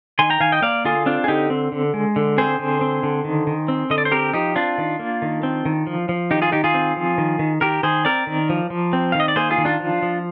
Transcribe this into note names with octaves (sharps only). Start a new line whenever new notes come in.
D#3 G#5 C6
G5 A#5
D#3 F5 G#5
D#5 G5
A#3 D5 F5
D3 F4 G#4
C4 D4 F4
G#4
D3 D#4 G4
C4
D3
G#3
D3
C4 G#4 C5
D3
C4
D3
D#3
D#3
C4
D3 D#5
D5
C5
C4 G4 A#4
F3 D#4 G4
C4 D4 F4
D#3
A#3
D#3
C4
D#3
F3
F3
D#3 D#4 G4
F4 G#4
D#3 D#4 G4
F4 G#4
C4
F3
D#3
D#3
D#3 G4 A#4
D#3 G#4 C5
C4 A#4 D5
D#3
F3
F3
C4
D#3 F5
D#5
D5
A#3 G#4 C5
F4 G#4
D#3
D4 F4
F3
F3